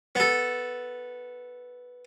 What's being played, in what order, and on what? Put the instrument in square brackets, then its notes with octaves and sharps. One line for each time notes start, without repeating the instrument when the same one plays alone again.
[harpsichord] B3 A4